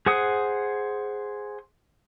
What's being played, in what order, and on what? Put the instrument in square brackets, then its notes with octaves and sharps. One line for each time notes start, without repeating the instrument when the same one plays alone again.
[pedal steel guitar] G#4 C5 F#5 D#6